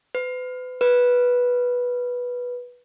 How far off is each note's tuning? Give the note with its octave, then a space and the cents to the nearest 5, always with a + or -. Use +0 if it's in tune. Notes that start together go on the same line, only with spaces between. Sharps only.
B4 +35
B4 -10